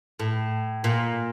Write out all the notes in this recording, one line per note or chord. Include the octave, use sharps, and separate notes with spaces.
A2
A#2